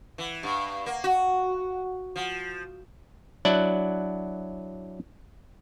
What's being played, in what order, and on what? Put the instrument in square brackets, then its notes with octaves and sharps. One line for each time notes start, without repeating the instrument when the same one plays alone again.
[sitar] E3
G2
A#3
F#4
F3
[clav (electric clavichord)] F#3 D4 E4 D5 F#5